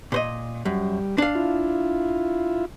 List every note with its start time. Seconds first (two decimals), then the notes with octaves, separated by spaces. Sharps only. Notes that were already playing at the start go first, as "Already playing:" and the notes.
0.12 A#2 C5 D#5
0.65 F#2 G3
1.18 D4 F5
1.35 E4 F4